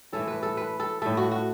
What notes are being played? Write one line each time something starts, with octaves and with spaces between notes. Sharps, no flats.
A2 E3 A3 A4
B4
A4
B4
A4
A2 A3 A4
F#4
F#4